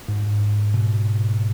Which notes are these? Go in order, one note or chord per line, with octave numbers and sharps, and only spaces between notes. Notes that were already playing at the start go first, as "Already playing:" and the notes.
G#2
B2